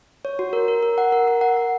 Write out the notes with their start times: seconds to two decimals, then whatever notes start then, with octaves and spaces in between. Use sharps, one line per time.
0.25 C#5
0.39 F#4
0.53 A#4
0.68 A#4
0.83 A#4
0.98 F#5
1.12 A#4
1.28 A#4
1.41 F#5
1.57 F#5